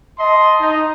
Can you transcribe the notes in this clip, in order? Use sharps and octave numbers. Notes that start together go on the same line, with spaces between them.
D#5 A5 C6
D#4